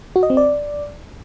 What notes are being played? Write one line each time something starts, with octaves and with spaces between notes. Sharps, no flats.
F#4
D#5
C4
D5